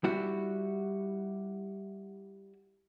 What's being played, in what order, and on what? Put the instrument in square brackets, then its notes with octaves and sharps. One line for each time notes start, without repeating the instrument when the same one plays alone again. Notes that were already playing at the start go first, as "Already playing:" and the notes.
[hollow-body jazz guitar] G3 E4 F#4